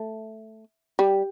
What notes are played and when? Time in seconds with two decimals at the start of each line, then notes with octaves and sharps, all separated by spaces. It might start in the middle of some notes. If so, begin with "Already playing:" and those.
Already playing: A3
0.99 G3